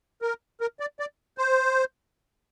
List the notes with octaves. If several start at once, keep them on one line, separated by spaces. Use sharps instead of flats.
A#4
A#4
D5
D5
C5